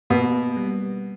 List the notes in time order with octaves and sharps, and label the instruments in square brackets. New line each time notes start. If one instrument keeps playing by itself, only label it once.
[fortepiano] B2 [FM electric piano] A#3
[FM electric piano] G3